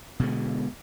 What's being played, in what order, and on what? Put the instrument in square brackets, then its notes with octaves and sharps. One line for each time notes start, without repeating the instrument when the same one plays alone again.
[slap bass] B2 D3 G#3